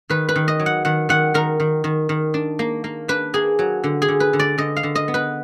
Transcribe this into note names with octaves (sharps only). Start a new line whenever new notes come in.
D#3 B4
B4
D#3
D#5
F#3
F#5
D#3 F#5
D#3 F#5
D#3 A#4
D#3
D#3
D#3
D4
A#3
A#3
D4 B4
A#3 G#4
F#3
D3
G#4
D3
B4
D3
D5
D3 D#5
F5
D3
D#5
B3
B4